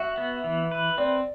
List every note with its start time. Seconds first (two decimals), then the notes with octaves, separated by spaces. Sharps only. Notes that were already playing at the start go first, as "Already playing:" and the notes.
Already playing: F#4 E5
0.18 B3
0.44 E3
0.71 B4
0.98 C4 D5